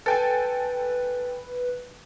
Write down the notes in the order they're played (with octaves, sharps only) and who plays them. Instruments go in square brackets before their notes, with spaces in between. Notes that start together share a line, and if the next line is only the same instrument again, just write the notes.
[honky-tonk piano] A4 G5 G#5 [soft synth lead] B4